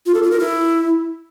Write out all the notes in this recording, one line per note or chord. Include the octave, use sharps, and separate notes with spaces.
F4
A4
F4
A#4
E4